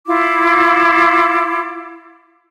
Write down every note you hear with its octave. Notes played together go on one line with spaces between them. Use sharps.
E4 F4 D6